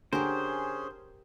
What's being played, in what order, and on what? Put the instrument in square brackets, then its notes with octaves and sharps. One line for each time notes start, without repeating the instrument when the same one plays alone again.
[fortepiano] D3 [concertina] C#4 G#4 [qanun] G4 A#4 [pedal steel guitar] C5